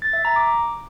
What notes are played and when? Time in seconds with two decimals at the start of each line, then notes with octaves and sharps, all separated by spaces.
0.02 A6
0.13 E5
0.25 A#5
0.36 D6